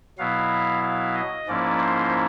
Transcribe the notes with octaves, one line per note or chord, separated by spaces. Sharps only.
B2 F#3 B3 E4 F5
F5
D#5
G#2 F3 A#3 C#4 E4 D5
C5